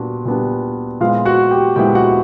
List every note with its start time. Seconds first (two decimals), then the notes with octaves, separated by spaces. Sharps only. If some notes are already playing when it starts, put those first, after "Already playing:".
Already playing: A#2 G3 B3 D4 F#4
0.25 A#2 G3 B3 D4
1.00 A#2 F3 G#3 B3 E4 F4 F5
1.25 F#4 F#5
1.51 G4 G5
1.76 A#2 F3 G#3 B3 E4 G4 G5
1.95 F#4 F#5